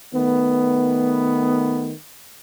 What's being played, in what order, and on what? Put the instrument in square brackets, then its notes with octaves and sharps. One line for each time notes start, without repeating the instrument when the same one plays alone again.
[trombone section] D#3 A3 B3